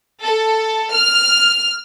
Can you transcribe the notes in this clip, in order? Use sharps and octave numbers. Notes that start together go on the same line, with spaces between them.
A4
F6